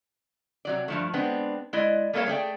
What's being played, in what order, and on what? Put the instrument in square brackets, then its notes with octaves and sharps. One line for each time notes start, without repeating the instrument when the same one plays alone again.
[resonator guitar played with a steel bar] C3 F#3 D5
G2 F3 A3
G#3 B3 C4 D4
G#3 E4 D5 D#5
G3 A3 A#3 A4 C#5 F5
A3 G#4 D5 G5